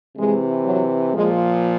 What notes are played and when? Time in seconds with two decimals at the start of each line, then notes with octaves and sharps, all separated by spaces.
0.17 C3 E3 G#3
0.65 F#3
1.13 A#2 F3 G#3